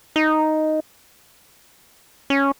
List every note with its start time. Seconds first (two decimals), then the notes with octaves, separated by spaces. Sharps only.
0.16 D#4
2.30 C#4